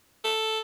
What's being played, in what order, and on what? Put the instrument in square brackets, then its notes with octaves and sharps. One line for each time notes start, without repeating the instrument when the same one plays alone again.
[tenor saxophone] A4